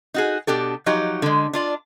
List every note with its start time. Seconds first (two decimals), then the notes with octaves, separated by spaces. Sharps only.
0.14 D#4 F#4 G#4
0.47 B2 D4 G4 A4
0.86 F3 F#3 D#4 G4
1.22 D3 G#3
1.53 D4 F4 D5